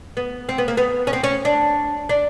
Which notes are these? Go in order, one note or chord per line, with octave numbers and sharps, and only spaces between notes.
B3
C4
B3
A#3
B3
C#4
C4
C#4
D4
D4